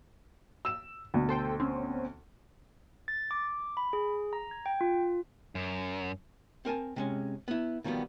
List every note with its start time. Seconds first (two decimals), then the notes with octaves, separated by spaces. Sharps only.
0.65 E6 E7
1.14 D2 B2
1.29 A4 C5 G5
1.60 C4 C#4
3.08 A6
3.31 D6
3.77 B5
3.93 G#4
4.33 A#5
4.51 G#6
4.66 G5
4.81 F4
5.55 F#2
6.65 C4 A#4 G#5 A5
6.96 C3 G#3 C#4
7.48 B3 E4
7.84 B2 D#3 F3 G3 B3